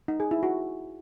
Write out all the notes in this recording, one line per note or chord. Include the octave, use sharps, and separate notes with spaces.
D#4
G#4
E4
F#4